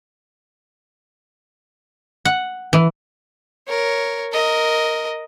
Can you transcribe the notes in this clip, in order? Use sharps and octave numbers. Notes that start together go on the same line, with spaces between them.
F#5
E3
A#4 C#5
A#4 D#5